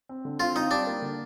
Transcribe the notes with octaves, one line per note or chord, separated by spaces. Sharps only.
C4
D3
C4 F4
C4 D#4
G3 D4
A#3
D3